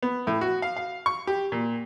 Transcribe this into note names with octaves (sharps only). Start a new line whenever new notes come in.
B3
A2
F#4
F5
F5
C#6
G4
A#2